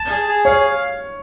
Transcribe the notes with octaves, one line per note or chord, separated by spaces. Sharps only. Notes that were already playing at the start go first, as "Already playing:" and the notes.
Already playing: A5
G#4
G#4
C#5 F5